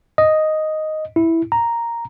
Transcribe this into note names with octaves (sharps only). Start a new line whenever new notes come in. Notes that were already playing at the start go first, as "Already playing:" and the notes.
D#5
E4
A#5